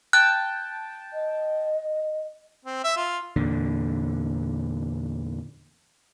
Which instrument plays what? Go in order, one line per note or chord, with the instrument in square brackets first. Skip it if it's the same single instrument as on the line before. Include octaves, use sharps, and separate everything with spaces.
[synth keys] G5 A5 [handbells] F#6
[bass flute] D#5
[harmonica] C4
E5
F4
[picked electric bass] E2 A#2 D3